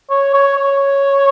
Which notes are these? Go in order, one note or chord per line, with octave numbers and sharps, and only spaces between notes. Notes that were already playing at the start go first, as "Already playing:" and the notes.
C#5
C#5
C#5